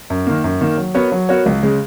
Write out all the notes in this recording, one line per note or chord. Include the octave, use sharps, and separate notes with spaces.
F#2
D#3 A#3
F#2
D#3 A#3
F#3
B3 F#4 A#4 C#5
F#3
B3 F#4 A#4 C#5
C#2
C#3 G#3